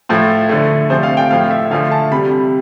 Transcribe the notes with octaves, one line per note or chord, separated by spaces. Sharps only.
A2 F3 A3
D3 A3
C3 F3 A3 C5
F5
G5
A2 F3 A3 F5
E5
D3 F3 A3 F5
A5
C3 G3 B5